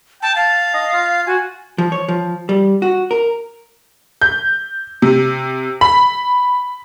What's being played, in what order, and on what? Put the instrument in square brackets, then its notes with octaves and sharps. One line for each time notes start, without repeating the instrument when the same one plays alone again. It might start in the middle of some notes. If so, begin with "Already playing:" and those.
[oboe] G5 [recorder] A5
[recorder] F5 [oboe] A5
[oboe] D#5
F4
[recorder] F#4 [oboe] G#5
[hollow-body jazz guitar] F3
C#5
F3
G3
F#4
A#4
[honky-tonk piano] G6
C3
B5